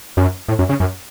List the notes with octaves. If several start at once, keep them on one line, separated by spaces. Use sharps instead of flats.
F#2
A2
F#2
C#3
F#2